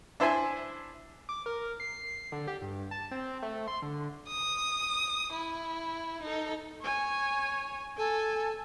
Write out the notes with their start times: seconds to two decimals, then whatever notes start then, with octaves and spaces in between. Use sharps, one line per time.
0.20 D4 E4 C5 E5 G#5
1.29 D6
1.46 A#4
1.80 C7
2.32 D3
2.47 G4
2.62 G2
2.91 A5
3.11 C4
3.42 A3
3.68 C6
3.82 D3
4.27 D#6
5.32 E4
6.22 D#4 A4
6.81 C#5 G#5
7.98 A4 G#5